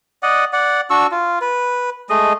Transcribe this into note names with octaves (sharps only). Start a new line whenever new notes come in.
D5 D#5 F#5
D5 F#5
D4 F#4 C#6 E6
F4
B4
G#3 A3 D#5